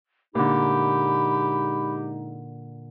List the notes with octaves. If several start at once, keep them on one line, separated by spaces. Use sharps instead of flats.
A#2 D3 G#3 D#4 G4 B5